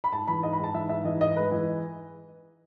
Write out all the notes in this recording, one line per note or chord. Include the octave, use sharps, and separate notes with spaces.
B5
G#2 A5
E3 B5
G#2 D#5
B5
G#2 A5
E3 E5
G#2 E5
E3 D#5
G#2 D#5
G#3 B4
E3